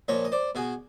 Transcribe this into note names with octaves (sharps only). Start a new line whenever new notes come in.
A#2 F3 C#5 D#5
D#5
C5 D5
B2 F#4 G#4